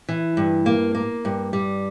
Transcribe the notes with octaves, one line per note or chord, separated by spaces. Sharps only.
E3
G2
A#3
A#3
G2
G3